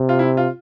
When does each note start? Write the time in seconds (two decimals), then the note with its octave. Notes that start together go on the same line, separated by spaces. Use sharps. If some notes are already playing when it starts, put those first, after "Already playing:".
Already playing: C3
0.09 F4
0.19 E4
0.37 F4